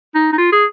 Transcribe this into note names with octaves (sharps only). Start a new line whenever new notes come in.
D#4
D#4
F4
G#4